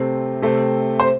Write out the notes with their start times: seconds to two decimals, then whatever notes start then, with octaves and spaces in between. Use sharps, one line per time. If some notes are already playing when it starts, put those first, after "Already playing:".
Already playing: C3 A3 C4
0.42 C3 A3 C4
1.00 C5